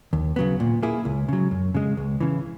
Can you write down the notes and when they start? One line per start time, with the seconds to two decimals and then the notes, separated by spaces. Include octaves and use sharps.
0.13 D#2
0.36 C#3 F#3 B3
0.60 A#2
0.83 A#3 E4 G#4
1.05 C#2
1.28 C#3 F#3
1.51 F#2
1.74 C#3 G#3
1.97 C#2
2.21 C#3 E3